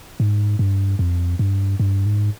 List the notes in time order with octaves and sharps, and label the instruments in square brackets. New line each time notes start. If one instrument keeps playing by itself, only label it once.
[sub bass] G#2
G2
F2
G2
G2
G#2